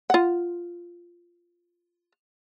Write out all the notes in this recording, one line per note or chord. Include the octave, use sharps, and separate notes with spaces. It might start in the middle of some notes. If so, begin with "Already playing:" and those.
F4 F#5